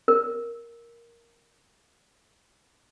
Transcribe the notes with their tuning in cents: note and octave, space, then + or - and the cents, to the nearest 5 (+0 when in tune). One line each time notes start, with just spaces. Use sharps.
A#4 +5